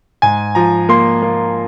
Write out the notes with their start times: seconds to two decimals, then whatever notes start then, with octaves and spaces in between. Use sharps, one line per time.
0.22 G#2 G#5
0.55 F3 A#5
0.89 A#3 C6
1.23 A#3